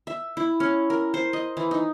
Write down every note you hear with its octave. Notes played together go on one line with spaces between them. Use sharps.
E5
E4
C#4
A#4
C5
D#5
E3
D#4